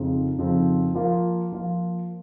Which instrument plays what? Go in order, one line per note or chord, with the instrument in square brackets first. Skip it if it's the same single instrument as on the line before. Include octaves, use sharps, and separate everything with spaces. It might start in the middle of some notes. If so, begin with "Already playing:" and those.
Already playing: [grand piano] F2 C#3 F3 C4 D#4
F2 C#3 F3 C4 D#4
F3 A#3 F4
F3 A#3 F4